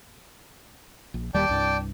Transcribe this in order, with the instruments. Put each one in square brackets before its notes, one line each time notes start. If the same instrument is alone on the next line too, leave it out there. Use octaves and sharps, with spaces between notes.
[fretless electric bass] A#1
[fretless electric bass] D#1 D#2 G3 [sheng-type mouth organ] D5 G5 A5
[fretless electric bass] C2 G2